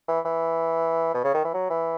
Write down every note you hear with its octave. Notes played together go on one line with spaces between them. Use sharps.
E3
E3
B2
C#3
D#3
E3
F#3
E3